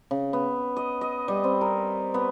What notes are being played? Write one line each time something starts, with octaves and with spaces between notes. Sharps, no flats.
C#3
B3
D#5
D#5
G3
C4
A#4
B3